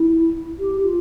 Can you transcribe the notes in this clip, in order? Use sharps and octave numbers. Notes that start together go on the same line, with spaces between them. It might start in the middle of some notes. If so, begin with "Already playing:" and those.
Already playing: E4
G4
F4